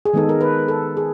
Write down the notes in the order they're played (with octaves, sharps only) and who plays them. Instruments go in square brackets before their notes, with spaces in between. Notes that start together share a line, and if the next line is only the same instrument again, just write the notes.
[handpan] G#4
D#3 G#3 B3 D#4 A4
A#4
B4
A4
G#4